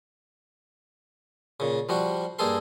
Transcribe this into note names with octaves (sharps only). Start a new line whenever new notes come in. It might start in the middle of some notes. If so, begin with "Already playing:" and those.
A#2 C#3
F3 G3 F#4
G2 A#3 G#4 A4 C6